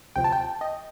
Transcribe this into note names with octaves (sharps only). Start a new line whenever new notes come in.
D2 C3 F3 G5
A5
G5
D#5